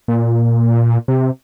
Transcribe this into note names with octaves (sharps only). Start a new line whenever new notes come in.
A#2
C3